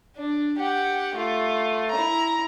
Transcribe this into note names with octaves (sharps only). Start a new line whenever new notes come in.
D4
G4 F#5
A3 F4
E4 A#5